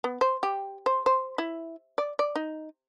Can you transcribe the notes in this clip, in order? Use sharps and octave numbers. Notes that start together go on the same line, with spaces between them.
B3
C5
G4
C5
C5
E4
D5
D5
D#4